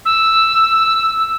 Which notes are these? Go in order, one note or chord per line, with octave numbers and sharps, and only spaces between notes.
E6